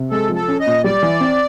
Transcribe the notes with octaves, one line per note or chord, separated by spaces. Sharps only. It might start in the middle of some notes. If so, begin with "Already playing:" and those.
Already playing: C3
G#3 A4
F3
A4
C#4
D#5
A#2
G3 D5
E3
C4